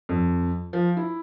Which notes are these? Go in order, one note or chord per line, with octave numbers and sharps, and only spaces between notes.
F2
F3
E4